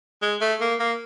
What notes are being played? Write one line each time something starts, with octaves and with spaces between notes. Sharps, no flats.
G#3
A3
A#3
A#3